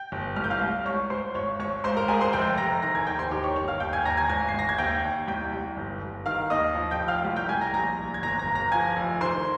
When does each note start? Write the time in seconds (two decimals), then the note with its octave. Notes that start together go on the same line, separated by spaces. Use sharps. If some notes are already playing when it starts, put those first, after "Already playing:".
Already playing: G5 G6
0.12 G1
0.36 C2 F6
0.44 G6
0.50 F5 F6
0.61 C2
0.85 C#2 C#5 C#6
1.10 C#2 C5 C6
1.34 G#1 C#5 C#6
1.60 G#1 C#5 C#6
1.84 C#2 C5 C6
1.97 A#4 A#5
2.08 C#2 G#4 G#5
2.21 C5 C6
2.33 F1 G5 G6
2.58 F1 A#5 A#6
2.82 D#3 A#5 A#6
2.95 G#5 G#6
3.07 D#2 G5 G6
3.19 C5 C6
3.31 D#3 G4 G5
3.43 C#5 C#6
3.56 G1 C#5 C#6
3.68 F5 F6
3.80 D#2 G5 G6
3.93 G#5 G#6
4.05 D#2 A#5 A#6
4.17 G#5 G#6
4.29 G#1 G#5 G#6
4.49 C7
4.54 G#1 A#6
4.69 G#6
4.78 D#2 G5 G6
5.04 D#2
5.28 C2 G5 G6
5.53 C2
5.77 G1
6.02 G1
6.26 D#3 F5 F6
6.50 D#2 D#5 D#6
6.75 F3
6.91 G5 G6
7.00 F1
7.08 F5 F6
7.25 C2
7.36 G5 G6
7.49 C2 G#5 G#6
7.61 A#5 A#6
7.74 A#1 A#5 A#6
7.98 A#1
8.14 G#6
8.22 G1 A#5 A#6
8.39 A#5 A#6
8.47 G1
8.55 A#5 A#6
8.72 F3 G#5 G#6
8.96 F1
9.21 D#3 C5 C6